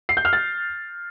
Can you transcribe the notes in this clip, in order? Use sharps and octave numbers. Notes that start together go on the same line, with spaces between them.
C7
G6
F6
A6